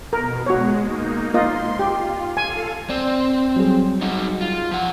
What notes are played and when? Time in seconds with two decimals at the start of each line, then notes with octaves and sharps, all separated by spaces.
0.13 B2 A#4
0.46 G#3 F#4 C#5
0.81 A#3 D#4
1.34 A#3 F4 D#5 C6
1.79 F4 G4
2.37 A4 F5 G#5
2.89 C4 D5
3.56 F#3 G3 G#4
4.01 D#4 F#4
4.41 F4
4.71 F3 F#5